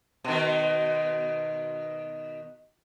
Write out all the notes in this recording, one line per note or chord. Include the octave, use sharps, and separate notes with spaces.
B2 D#3